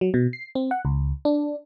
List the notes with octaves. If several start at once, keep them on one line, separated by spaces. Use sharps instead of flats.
F#3
B2
C7
C4
F#5
C#2
D4